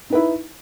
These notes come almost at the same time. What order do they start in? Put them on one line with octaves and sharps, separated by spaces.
D#4 B4 E4